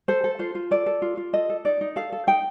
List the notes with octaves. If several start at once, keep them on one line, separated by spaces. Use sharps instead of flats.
A4 C5
A4
F4 C5
F4
A4 D5
A4
F4
F4
A4 D#5
A4
D#4 D5
D#4
A4 F5
A4
D#4 G5